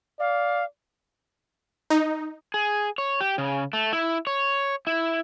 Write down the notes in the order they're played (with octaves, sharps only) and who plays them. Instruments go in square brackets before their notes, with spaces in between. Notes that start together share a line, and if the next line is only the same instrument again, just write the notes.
[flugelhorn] D5 [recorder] F5
[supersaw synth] D#4
[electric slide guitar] G#4
C#5
G4
C#3
A3
E4
C#5
E4